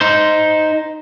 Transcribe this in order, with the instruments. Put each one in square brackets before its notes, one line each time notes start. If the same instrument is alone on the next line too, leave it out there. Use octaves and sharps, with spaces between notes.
[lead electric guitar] D#4 C5